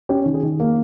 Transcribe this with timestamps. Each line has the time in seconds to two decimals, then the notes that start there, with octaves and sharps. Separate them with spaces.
0.09 C#4 G4
0.26 D#3
0.34 G#4
0.43 D#3
0.60 A#3